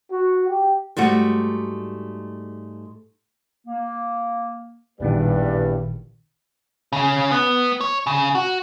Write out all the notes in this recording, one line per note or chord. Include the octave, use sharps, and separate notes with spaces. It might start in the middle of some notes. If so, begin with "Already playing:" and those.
F#4
G4
G#2 G3 A3 F#4
A#3
A1 E2 G2 A#2 D#3 G3 B4 D5
C#3 C#4
B3
C#5
C#3
F#4